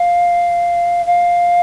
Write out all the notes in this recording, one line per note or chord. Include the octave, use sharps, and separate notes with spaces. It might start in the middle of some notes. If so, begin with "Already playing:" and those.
Already playing: F5
F5